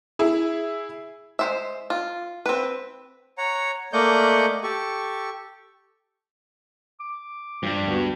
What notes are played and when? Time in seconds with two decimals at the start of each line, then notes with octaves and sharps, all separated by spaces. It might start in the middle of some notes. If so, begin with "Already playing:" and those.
0.19 E4 G#4
1.39 G#3 C5 E5
1.90 F4
2.46 C4 B4
3.38 C#5 F#5 A#5
3.93 A3 A#3 D5 D#5 F#5 G6
4.63 G4 A4 C#6
7.00 D6
7.63 G2 F3 G3
7.86 D2 B3 F#4